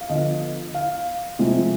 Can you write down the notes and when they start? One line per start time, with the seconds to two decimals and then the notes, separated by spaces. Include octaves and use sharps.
0.01 F5
0.09 D3 F3 B3 D#5
0.74 F5
1.39 C3 F3 G#3